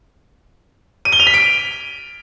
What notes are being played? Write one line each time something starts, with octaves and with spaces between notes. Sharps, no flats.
D#7
G7
F7
B6
D7